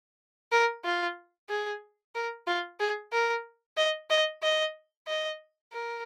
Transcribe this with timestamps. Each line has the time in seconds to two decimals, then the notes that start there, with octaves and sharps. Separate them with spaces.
0.52 A#4
0.85 F4
1.49 G#4
2.15 A#4
2.47 F4
2.80 G#4
3.12 A#4
3.77 D#5
4.10 D#5
4.43 D#5
5.08 D#5
5.73 A#4